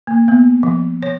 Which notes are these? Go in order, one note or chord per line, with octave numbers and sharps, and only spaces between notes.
A#3
B3
F3
C#5